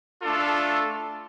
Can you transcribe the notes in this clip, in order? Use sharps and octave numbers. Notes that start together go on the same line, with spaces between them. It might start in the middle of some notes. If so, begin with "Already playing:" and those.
A3 D4 F4 A4